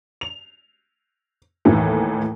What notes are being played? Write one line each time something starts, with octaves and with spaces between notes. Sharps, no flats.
F7
D#2 A2 D#3 E3 A3